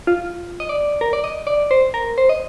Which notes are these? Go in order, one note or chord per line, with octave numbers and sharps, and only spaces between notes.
F4
D#5
D5
A#4
D5
D#5
D5
C5
A#4
C5
D#5